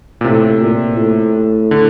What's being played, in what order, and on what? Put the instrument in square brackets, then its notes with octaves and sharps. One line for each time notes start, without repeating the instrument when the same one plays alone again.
[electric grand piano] A#2
[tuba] A2 [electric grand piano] C3
[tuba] A#2
A2
[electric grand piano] D3